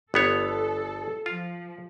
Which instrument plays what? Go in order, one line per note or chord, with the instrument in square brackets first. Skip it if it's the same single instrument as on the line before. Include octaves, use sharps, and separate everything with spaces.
[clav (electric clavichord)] G1 B3 C#5 [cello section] A4
[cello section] F3 [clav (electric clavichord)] F4